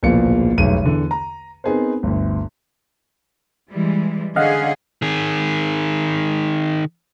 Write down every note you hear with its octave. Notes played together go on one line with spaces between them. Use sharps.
D1 A#1 B2 A#3 F4 C#7
F1 B1 G#2 B2 D#7
E2 D3
A#5
B3 C4 D#4 G#4 A#4 C5
G1 D2
E3 G3 G#3
D3 C#4 G#4 D#5 F5 F#5
D#3 G#4